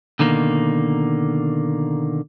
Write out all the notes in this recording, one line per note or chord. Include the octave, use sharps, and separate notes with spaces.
B2 D3 D#3 A#3